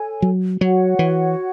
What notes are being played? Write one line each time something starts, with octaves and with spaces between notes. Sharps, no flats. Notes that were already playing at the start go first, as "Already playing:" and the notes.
Already playing: A4 C#5 G#5
F#3
F#3 F#4 C#5 F#5
E3